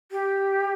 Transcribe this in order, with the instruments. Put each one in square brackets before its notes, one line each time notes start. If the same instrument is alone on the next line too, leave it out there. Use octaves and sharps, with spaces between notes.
[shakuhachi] G4